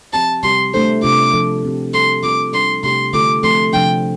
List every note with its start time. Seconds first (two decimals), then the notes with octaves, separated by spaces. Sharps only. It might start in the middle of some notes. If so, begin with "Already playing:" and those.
0.13 F3 C4 G4 A5
0.43 C3 G3 C4 G4 C6
0.74 A3 D4 A4 C5
1.03 C3 A3 D4 F4 D6
1.33 F3 D4 A4
1.64 F3 C4 G4
1.94 G3 D4 A4 C6
2.23 G3 C4 F4 A4 D6
2.53 G3 D4 A4 C6
2.83 C3 A3 D4 G4 C6
3.13 D3 A3 F4 A4 D6
3.43 F3 A3 C4 A4 C6
3.73 C3 F3 D4 G5